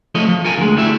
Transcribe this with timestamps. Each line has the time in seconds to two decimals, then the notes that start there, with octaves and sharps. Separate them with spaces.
0.15 F3 A3 C#5 D#5
0.28 F3
0.44 A4 A#4 G#5
0.57 D2 G#3
0.77 G3 A3 E4 E5